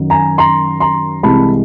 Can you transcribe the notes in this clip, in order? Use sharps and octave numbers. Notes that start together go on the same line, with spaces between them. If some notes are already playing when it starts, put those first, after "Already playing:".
Already playing: F#2 D#3 F#3
G#5 A#5
A#5 C6
A#5 C6
C2 C3 E3 G#3 A5 B5